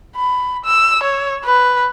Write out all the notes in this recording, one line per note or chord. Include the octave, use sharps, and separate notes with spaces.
B5
E6
C#5
B4